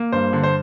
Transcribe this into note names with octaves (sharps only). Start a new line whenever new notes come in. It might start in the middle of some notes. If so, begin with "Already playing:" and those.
Already playing: A#3
G2 C5
D3
C5